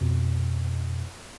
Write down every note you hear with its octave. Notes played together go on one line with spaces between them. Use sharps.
F2 B2